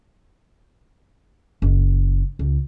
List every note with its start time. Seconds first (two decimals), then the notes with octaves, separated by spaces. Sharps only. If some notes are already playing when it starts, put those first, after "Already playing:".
1.62 F#1
2.39 C#2